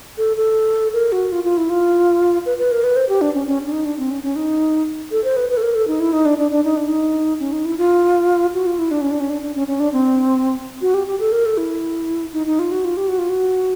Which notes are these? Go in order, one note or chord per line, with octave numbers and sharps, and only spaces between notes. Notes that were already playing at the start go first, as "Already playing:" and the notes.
A4
A4
A#4
F#4
F4
F4
E4
F4
B4
B4
A#4
B4
C5
G4
D4
C#4
C#4
D4
D#4
D4
C4
C#4
C#4
D#4
A4
C5
B4
B4
A4
A#4
A4
D#4
E4
D#4
D4
D4
D4
D#4
D4
D#4
C#4
D#4
E4
F4
F#4
F4
E4
D4
C#4
D4
C#4
D4
D4
C#4
C#4
D4
C4
F#4
G4
G4
A4
A#4
A4
E4
D#4
D#4
F4
F#4
F4
G4
F#4
F4
F#4